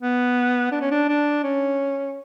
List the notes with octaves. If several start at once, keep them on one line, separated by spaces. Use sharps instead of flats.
B3
D4
C#4
D4
D4
C#4